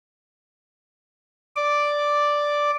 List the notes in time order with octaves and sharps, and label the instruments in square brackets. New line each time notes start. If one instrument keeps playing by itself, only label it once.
[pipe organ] D5 D6